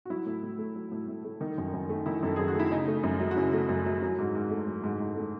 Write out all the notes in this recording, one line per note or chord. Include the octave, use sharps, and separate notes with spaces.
F#4
F#3 E4
A2
A2
A3
F#3
A2
A2
A3
D#3
F#2
F#2
A3
D#3 E4
F#2 A4
F#2 G#4
F#4
A3 E4
C#3 D#4
A3
F#2
F#3
F#4
C#3 E4
A3
F#2
F#3
F#3
G#2
G#2
A3
F#3
G#2
G#2
A3